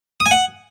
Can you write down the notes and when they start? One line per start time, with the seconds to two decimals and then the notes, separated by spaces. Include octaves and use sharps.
0.20 D#6
0.26 G#5
0.31 F#5